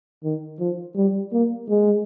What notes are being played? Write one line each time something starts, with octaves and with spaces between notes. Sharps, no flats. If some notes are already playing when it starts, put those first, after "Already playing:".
D#3
F3
G3
A#3
G#3